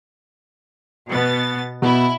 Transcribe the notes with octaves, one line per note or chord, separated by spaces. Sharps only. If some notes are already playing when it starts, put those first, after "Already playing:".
B2 B3 A6
B2 E4